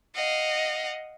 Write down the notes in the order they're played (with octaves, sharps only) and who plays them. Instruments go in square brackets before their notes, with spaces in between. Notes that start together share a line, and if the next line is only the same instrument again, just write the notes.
[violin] D#5 [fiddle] F5 F#5